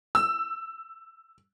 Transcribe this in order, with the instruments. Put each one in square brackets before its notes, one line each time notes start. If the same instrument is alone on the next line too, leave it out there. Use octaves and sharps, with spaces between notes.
[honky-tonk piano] E6